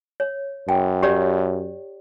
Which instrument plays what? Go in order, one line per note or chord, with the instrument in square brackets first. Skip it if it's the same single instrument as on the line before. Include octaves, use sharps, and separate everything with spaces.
[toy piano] C#5
[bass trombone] F#2 [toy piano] G5
[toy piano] G4 C#5 D5